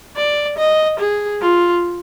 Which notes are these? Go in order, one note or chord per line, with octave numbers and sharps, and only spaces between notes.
D5
D#5
G#4
F4